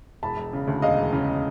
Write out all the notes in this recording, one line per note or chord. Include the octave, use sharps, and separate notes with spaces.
E1 A5 B5
E1
C#3
D2
E1 D#5 F5
E1
C#3